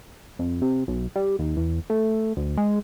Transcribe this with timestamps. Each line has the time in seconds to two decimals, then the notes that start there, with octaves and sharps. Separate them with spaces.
0.39 F2
0.62 C3
0.88 B1
1.16 G3
1.39 D#2
1.57 E2
1.90 A3
2.37 D2
2.57 G#3